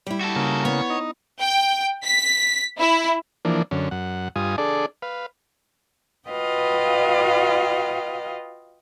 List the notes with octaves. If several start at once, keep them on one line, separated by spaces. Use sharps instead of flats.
G3 E4
F#4 A4
C#3 A#3
B3 C#5
D#4
G5
B6
E4
E3 F3 A#3 D4
F#2 D3 C#4
F#2 F#5
G2 F4 G#5 D#6
D4 G#4 A4 D5
B4 F5
F4 F#4 B4 D#5 F5 G5